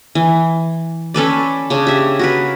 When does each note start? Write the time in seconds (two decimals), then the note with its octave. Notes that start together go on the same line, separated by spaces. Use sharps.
0.15 E3
1.14 C#4 A4 B4 D5
1.70 C#3 D4 C#5
1.87 G4 E5
2.19 F#4 A#4 B4